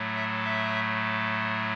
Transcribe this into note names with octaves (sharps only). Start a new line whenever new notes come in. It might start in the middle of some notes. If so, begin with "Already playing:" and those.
Already playing: A2 F#3 A3
E5
E5